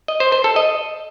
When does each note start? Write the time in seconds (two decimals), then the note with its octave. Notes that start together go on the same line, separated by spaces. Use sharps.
0.08 D#5
0.20 C5
0.32 C5
0.44 A4
0.56 D#5